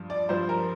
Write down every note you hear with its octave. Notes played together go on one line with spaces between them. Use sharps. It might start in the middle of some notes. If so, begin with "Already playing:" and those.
Already playing: G2 F3
D5
G2 F3 C5
A#4